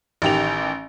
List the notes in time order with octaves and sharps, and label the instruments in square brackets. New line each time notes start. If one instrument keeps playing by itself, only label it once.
[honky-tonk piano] A1 D#3 G4 F7